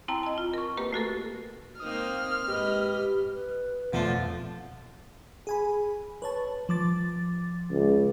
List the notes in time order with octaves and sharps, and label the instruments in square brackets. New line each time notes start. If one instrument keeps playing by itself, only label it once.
[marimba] C4 E4 G5 A5 A#5
D#5 A5
F4
A#4 C#6
A#3 G4 B4
A3 F#4 A4 A#4
[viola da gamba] A#3 C4 D#4 [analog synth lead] D#6 [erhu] F6
[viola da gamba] G#2 B4 D#5 [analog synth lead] G4
[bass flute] B4
[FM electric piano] F2 B2 [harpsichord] D3 A3 D4 [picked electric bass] F3 [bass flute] B3
[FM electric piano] G#4 G#5 B5
B4 C#5 A5
F3 D6 A6
[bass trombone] C#2